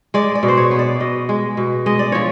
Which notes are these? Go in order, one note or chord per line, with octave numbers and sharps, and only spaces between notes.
G#3 D5
D5
B2
C5
C#5
B3
D5
B2 D#5
G#3
B2
G#3 D#5
D5
F3 C#5